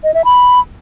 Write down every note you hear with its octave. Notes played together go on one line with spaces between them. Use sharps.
D#5
E5
B5